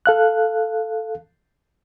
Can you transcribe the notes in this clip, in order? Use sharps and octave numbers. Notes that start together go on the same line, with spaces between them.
A4 F5 F#6